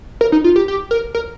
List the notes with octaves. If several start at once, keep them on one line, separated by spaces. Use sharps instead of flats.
A#4
D#4
F4
G4
G4
A#4
A#4